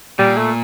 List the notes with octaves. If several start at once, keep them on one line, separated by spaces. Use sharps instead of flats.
A#2 G3
A3